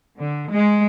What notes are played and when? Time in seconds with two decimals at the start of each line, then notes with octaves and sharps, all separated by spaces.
0.16 D3
0.49 G#3